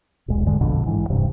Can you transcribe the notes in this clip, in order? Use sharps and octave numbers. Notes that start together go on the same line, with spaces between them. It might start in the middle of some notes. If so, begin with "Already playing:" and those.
D#1 B1 G#3
G2 D3 G#3
A#1 F2 B2 D3
A1 G#2 E3
D#1 G2 C3